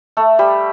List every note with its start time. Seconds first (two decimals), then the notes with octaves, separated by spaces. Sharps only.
0.17 A3 A4
0.39 G3 G4